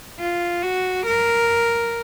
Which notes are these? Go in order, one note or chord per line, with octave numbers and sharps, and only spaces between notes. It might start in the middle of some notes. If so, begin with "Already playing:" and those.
F4
F#4
A#4